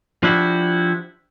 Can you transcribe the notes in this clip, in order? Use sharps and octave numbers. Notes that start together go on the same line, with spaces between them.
F3 D4 E4 F#4 G4